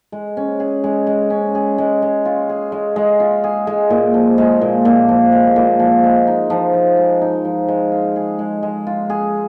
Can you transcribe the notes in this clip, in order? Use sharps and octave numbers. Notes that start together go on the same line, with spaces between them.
G#3
C#4
G#4
G#3
G#3
C#4
G#4
G#3
G#3
F4
G#4
G#3
G#3
F4
G#4
G#3
A#2
F3
G#3
A#2
A#2
F3
G#3
A#2
F3
G#3
D#4
F3
F3
G#3
D#4
F3
G#3
F4
G#4
G#3
G#3
F4
G#4